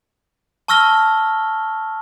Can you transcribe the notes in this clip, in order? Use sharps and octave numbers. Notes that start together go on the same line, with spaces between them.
A5 C#6 E6 F6 A#6 G7